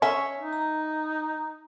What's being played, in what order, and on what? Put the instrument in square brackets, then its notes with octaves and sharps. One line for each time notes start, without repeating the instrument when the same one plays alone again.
[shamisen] C#4 [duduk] C#5 [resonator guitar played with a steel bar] E5
[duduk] D#4
[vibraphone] A#5